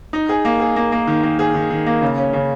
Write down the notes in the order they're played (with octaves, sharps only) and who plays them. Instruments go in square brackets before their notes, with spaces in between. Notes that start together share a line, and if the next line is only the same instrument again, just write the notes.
[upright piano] D#4
G#4
A#3
G#4
A#3
A#3
D#3
A#3
G#4
D#3
D#3
A#3
C#3
C#4
C#3